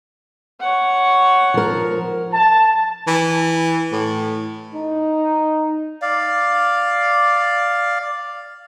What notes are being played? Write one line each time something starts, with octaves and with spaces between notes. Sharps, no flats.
C#5 F#5
F3 A#4
A5
E3
A2
D#4
D5 F5